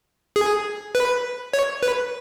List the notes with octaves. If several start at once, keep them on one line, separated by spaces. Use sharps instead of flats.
G#4
B4
C#5
B4